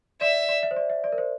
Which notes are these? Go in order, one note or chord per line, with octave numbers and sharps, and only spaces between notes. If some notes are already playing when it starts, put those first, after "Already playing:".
D5 E5
D5
E5
C5
D5
E5
D5
A#4
C5